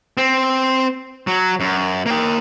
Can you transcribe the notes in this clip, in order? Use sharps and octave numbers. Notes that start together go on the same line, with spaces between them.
C4
F#3
F#2
A#3 G5